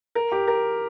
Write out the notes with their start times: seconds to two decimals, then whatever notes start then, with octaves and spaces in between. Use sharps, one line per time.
0.15 A#4
0.32 G4
0.48 A#4